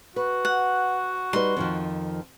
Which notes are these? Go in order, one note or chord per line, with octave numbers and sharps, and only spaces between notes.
F#4 B4
F#5
G3 D#4 B4 C6
F2 D#3 F3